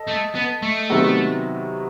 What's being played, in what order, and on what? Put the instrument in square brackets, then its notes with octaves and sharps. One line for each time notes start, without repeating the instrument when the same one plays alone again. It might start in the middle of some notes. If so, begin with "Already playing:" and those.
Already playing: [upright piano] A4 D#5
[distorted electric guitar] A3
B3
A3
[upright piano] C3 D#3 F#3 B3 F#4